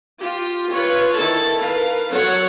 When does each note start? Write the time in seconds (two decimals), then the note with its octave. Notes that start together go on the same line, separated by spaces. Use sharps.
0.19 F4 G4
0.70 F4 B4 C#5
1.14 D#3 E4 A4 A5
1.58 A#4 B4 F5
2.11 F#3 A4 C#5 F#5